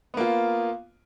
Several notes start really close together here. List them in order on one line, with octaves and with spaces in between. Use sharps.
B3 A#3 F4